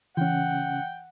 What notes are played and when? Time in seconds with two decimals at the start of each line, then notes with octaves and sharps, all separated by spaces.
0.17 C#3 E3 C#4 F#5 G5